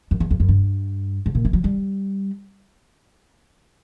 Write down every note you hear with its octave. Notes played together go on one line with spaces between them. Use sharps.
F#2
E2
F2
F#2
G2
G#2
A#2
E3
F#3
G3